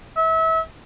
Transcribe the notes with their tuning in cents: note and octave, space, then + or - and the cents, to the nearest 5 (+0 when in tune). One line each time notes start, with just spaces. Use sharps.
E5 -30